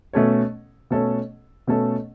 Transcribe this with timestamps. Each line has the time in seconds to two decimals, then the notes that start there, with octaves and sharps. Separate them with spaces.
0.13 B2 A3 C#4 A4 C#5
0.90 B2 A3 C#4 A4 C#5
1.67 B2 A3 C#4 A4 C#5